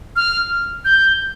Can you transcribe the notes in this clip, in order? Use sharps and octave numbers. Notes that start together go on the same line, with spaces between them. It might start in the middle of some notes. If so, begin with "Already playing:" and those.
F6
G6